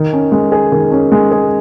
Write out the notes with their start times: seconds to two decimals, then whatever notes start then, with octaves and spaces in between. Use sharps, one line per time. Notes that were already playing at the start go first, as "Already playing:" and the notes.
Already playing: D#3
0.13 C#4
0.32 G#3
0.52 G#4
0.72 D#3
0.91 C#4
1.12 G#3
1.31 G#4